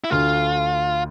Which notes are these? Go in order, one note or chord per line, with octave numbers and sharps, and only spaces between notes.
E4
D2 D3 A3 F4